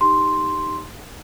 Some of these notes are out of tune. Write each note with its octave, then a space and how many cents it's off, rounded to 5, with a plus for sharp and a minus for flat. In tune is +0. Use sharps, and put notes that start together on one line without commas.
D#4 +0 G4 +0 C6 +0